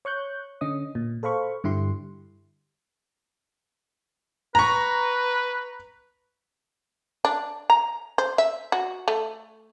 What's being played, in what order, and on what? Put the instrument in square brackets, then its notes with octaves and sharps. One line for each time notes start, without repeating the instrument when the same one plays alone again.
[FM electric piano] C#5 C#6 F#6 G6
D3 C#4 D#5 D#6
A#2
A4 C5 F5 B5 C#6
G2 D3 E4 G4 C6
[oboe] B4 [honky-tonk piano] A#5 C#6
[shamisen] D4
A#5
C5
E5
F#4
A3